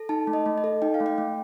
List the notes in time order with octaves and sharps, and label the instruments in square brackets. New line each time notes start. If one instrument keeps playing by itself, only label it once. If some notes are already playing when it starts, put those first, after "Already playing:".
Already playing: [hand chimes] A4
D#4 A5
A3
D#5
A3
D#5
A4
D#4 G5
F5
A3
G5
A3